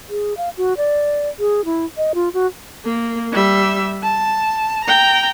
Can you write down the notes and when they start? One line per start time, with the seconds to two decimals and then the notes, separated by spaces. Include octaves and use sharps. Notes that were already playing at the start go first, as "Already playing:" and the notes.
0.10 G#4
0.37 F5
0.58 F#4
0.77 D5
1.39 G#4
1.65 E4
1.97 D#5
2.15 F4
2.34 F#4
2.85 A#3
3.32 G3 E5
4.03 A5
4.85 G5 A#5